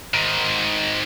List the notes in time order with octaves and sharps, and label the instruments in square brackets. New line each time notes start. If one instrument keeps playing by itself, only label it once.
[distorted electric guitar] G#2 D#3